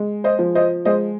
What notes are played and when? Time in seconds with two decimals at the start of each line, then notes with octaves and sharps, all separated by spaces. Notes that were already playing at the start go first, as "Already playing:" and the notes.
Already playing: G#3
0.24 C5 D#5
0.39 F3
0.55 C5 D#5
0.85 G#3 C5 D#5